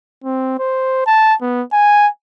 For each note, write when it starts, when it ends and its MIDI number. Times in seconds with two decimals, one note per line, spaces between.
0.24 0.57 60
0.59 1.01 72
1.06 1.34 81
1.41 1.63 59
1.73 2.08 80